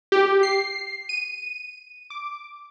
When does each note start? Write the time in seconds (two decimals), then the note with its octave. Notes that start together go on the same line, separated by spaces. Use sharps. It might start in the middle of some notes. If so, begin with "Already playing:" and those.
0.12 G4
0.43 C7
1.09 D#7
2.10 D6